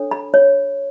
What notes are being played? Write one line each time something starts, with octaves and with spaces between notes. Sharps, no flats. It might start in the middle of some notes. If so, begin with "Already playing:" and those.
Already playing: D4 A4 C#5
B5
C#5